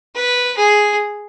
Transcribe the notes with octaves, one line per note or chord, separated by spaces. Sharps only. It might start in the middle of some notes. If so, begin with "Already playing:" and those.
B4
G#4